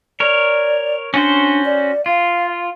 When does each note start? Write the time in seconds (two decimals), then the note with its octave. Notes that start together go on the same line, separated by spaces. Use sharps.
0.20 A#4 C#5 D5
1.14 C#4 D4 F#4 C5
1.65 D5
2.06 F4 F5